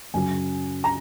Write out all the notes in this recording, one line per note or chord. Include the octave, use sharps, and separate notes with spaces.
F#2 C#3 F#3 G#5
A#5